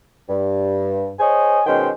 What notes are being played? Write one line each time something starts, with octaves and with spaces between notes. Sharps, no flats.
G2
G#4 C5 C#5 D#5 G#5
B2 D#3 G#3 C#4 C5 G5